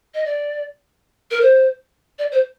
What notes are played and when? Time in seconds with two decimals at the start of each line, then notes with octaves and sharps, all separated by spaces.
0.14 D#5
0.25 D5
1.31 A#4
1.41 C5
2.19 D5
2.32 C5